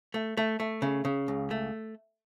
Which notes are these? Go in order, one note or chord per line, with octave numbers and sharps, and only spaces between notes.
A3
A3
A3
C#3
C#3
C#2
A3